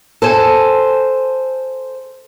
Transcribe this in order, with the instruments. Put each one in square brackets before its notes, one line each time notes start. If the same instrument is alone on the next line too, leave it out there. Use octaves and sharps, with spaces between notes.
[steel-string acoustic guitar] A4 C5 G#5